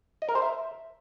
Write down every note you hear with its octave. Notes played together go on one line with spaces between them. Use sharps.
D#5
A#4
C5
E5